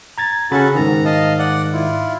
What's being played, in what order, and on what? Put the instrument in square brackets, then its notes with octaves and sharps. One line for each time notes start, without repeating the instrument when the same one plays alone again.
[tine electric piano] A#5 G#6 A6
[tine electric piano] C#3 B5 A6 [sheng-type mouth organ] C#4 F#4 A4
[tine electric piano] G#2 D#3 [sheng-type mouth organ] A#5
[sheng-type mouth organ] D#5 F5 A5
D5 F#5
E4 F4